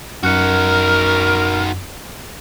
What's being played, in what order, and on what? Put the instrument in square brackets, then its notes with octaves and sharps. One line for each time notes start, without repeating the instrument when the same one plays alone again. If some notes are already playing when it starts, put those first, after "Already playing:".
[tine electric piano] F#2 F#6 C#7 [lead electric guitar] D#4 F#4 [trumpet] A#4 [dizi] F6